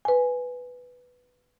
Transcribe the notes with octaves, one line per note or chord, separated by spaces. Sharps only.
B4 G#5